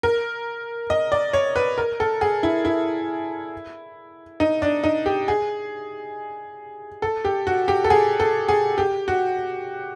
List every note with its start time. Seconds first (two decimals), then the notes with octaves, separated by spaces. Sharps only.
0.03 A#4
0.90 D#5
1.12 D5
1.33 C#5
1.56 B4
1.78 A#4
2.00 A4
2.21 G#4
2.43 E4
2.65 E4
4.40 D#4
4.62 D4
4.84 D#4
5.06 G4
5.28 G#4
7.02 A4
7.25 G4
7.47 F#4
7.68 G4
7.84 A4
7.90 G#4
8.20 A4
8.49 G#4
8.78 G4
9.08 F#4